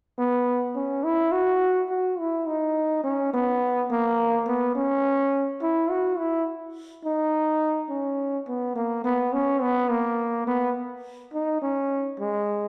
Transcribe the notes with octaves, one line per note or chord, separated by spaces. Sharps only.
B3
C#4
E4
F#4
F#4
E4
D#4
C#4
B3
A#3
B3
C#4
E4
F#4
E4
D#4
C#4
B3
A#3
B3
C#4
B3
A#3
B3
D#4
C#4
G#3